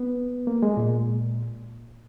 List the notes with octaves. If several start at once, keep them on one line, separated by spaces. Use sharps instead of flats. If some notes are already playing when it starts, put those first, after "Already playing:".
Already playing: B3
A#3
G#3
A#2